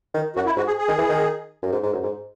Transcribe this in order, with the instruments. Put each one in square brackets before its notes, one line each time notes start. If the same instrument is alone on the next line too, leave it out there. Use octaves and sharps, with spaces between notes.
[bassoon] D#3
[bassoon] F#2 [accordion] F#4
[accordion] E4
[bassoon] G#2 [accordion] F#4
[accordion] G#4
G#4
[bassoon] D#3
E3
D#3
F#2
G#2
G#2
F#2
G#2